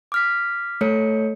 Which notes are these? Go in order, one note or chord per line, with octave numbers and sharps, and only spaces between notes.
D6 F6 B6
A3 A4 C#5 C#7